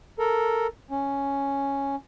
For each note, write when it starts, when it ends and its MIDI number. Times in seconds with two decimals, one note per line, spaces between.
0.19 0.67 69
0.19 0.67 70
0.91 1.96 61